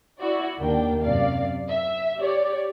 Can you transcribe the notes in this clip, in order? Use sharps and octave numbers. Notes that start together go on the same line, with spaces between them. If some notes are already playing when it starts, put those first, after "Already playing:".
E4 F#4 D5
D#2 A#3 D4 G5
F#2 C3 D5 F5
E5
G4 C#5 D5